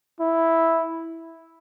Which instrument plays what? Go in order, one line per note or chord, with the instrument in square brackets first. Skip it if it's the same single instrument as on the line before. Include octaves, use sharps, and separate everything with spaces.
[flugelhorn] E4